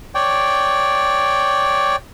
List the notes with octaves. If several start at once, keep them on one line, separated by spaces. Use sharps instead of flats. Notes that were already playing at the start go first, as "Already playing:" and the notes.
C#5 D5 G5